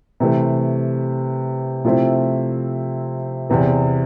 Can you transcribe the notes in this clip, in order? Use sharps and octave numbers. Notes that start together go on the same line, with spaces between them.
C3 E3 A3
C3 F3 A3 C4 E4
E2 C3 E3